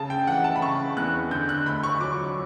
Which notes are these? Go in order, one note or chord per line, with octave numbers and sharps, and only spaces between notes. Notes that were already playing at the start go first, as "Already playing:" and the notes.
Already playing: C#3 A5
G5
E3 F#5
A5
B5
C#3 C#6
E2 F#6
D3 G6
F#6
D2 B5
C#6
F#3 D6